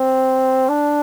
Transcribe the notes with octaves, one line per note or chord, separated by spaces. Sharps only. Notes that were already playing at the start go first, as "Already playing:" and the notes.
Already playing: C4
D4